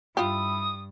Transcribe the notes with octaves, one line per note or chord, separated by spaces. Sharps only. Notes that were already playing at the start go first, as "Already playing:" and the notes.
G2 E4 F4 G4 D#6